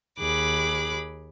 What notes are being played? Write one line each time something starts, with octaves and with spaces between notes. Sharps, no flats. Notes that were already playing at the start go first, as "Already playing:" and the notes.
D#2 G#4 B5 D6 F#6